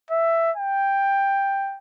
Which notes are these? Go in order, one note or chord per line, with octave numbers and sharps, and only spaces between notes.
E5
G5